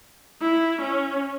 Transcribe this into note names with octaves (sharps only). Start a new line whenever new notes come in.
E4
C#4